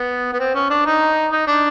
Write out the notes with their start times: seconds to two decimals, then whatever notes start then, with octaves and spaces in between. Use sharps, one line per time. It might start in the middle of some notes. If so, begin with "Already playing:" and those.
Already playing: B3
0.33 B3
0.39 C4
0.55 C#4
0.70 D4
0.86 D#4
1.32 D#4
1.47 D4